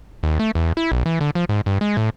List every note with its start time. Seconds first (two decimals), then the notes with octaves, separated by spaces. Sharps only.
0.23 D#2
0.39 A3
0.55 E2
0.77 E4
0.92 B1
1.06 E3
1.21 D3
1.35 F3
1.49 G#2
1.66 G2
1.81 G#3
1.97 A2